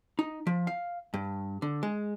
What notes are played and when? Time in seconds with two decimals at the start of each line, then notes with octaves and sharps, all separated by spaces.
0.19 D#4
0.47 F3
0.67 F5
1.14 G2
1.62 D3
1.83 G#3